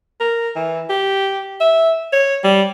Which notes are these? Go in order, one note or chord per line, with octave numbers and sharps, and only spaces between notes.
A#4
E3
G4
E5
C#5
G3